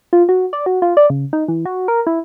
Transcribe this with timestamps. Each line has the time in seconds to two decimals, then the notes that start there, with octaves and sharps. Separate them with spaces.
0.13 F4
0.29 F#4
0.53 D5
0.66 F#4
0.82 F4
0.97 D5
1.10 C#3
1.33 D#4
1.48 E3
1.66 F#4
1.88 A#4
2.07 E4